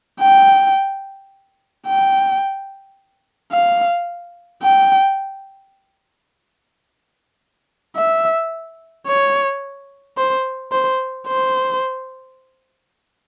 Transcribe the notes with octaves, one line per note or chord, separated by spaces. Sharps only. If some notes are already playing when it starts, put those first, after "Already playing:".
G5
G5
F5
G5
E5
C#5
C5
C5
C5